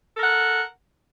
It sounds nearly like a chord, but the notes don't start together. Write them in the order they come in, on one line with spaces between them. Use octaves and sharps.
A4 A#4 F#5